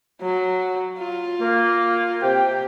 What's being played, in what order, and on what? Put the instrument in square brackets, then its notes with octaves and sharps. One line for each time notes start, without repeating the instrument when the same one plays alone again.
[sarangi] F#3
F4
[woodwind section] A#3
[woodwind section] C3 G5 [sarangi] G4